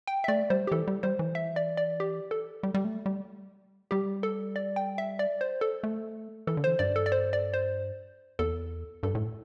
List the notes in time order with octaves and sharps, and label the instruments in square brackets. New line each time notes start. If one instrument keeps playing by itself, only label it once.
[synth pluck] G5
E5
[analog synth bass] A3 [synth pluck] D5
[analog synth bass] G3 [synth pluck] C5
[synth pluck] G4
[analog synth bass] E3 [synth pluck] A4
[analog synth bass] G3
[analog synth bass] G3 [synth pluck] C5
[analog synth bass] E3
[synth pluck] E5
D5
D5
G4
A4
[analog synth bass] G3
G3
A3
G3
[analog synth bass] G3 [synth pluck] G4
[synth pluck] A4
D5
G5
E5
D5
C5
A4
[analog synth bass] A3
[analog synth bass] E3 [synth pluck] A4
[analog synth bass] D3
[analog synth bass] E3 [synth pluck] C5
[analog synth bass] G2 [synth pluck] D5
[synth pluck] A4
D5
C5
D5
C5
[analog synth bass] E2 [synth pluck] A4
[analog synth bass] G2 [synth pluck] A4
[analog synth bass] A2